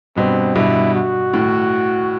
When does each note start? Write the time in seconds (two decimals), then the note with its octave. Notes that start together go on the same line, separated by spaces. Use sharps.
0.16 G2 B2 C4
0.55 G2 B2 E4
0.94 F#4
1.34 A2